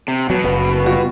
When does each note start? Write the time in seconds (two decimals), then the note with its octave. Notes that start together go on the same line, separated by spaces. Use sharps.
0.08 C3
0.30 B2 F#3
0.44 F#1 B4
0.85 G3 F4 F#4